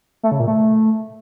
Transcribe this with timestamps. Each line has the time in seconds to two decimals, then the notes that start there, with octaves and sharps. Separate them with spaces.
0.23 A3
0.32 C#3
0.40 A#2
0.48 A3